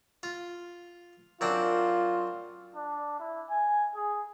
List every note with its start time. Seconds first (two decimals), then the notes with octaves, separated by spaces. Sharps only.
0.23 F4
1.41 F#2 C4 D4 F4
2.76 D4
3.20 E4
3.50 G#5
3.95 G#4